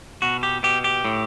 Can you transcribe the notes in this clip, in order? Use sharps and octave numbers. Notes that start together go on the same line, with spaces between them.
B2 F#4
G4
B2 G4
G4
A2